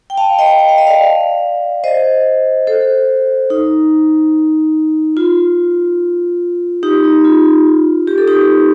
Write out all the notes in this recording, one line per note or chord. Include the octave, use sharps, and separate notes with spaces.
G5
F5 A5
D#5 G5
G5
F5
D#5
D5 F5
C5 D#5
A4 C5
D#4
F4
D#4 G4
D#4
F4
G4
A4
D#4 G4